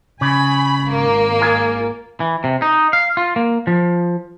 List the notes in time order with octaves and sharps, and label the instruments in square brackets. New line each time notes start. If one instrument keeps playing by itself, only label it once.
[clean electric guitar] C#3 [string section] G#5 B5
[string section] G#1 A#3
[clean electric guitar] F4 G#4
E3
C3
D#4
F5
F4
A#3
F3